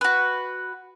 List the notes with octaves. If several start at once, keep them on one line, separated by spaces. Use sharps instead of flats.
F#4 B4